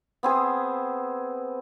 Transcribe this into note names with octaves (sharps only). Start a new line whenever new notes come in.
B3 C4 G#4